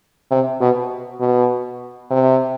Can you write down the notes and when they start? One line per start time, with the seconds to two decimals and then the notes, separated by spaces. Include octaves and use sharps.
0.31 C3
0.61 B2
1.20 B2
2.11 C3